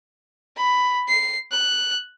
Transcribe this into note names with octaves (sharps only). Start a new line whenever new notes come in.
B5
C7
F#6